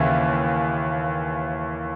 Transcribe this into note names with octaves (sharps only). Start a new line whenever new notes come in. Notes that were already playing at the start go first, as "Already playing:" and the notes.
Already playing: D#2 C#3 E3